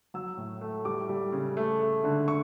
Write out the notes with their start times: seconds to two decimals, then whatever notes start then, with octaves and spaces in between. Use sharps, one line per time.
0.14 F#3 E6
0.37 A2
0.61 A3
0.85 G3 D6
1.09 G3
1.32 C#3
1.57 A3
1.80 A3
2.04 D3
2.28 C#6